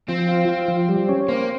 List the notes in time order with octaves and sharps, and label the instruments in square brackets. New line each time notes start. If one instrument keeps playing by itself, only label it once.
[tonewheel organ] F3 [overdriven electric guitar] C4
[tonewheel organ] F4
F4
F3
G3
C#4
[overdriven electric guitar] A#3 [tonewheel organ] C4